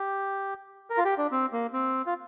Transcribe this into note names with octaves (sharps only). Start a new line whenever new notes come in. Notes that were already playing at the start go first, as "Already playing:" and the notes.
Already playing: G4
A#4
F4
G4
D4
C4
A#3
C4
F4